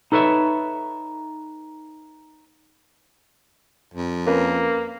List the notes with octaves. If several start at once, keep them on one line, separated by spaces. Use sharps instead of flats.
D#4 A4 B4 C#5 E5
F2
A#3 C#4 A#4 B4